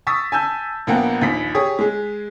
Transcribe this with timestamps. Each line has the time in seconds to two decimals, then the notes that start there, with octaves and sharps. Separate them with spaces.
0.07 C#6 D#6 E6 A6 B6
0.32 G#5 A5 E6 G6
0.87 A#1 A#3 B3 F#5 G5
1.21 A#1 D#2 B6
1.55 G4 G#4 C#5 D#6
1.79 G#3 G#4